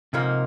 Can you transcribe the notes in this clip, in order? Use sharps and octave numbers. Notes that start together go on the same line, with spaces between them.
G#2 C3 F3 A#3 D#4